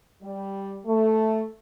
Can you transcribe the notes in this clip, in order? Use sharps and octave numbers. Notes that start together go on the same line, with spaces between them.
G3
A3